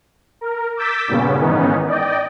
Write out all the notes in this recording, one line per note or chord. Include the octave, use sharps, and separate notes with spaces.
A#4
D6 E6 G6 A6 B6
G2 A#2 C#3 B3 C#4
G#2 D#3 E3 B3 C#4 D#4
D5 D#5 G5